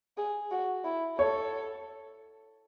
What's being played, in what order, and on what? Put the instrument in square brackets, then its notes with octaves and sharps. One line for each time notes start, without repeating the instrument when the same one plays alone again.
[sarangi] G#4
F#4
E4
[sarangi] A4 [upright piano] C#5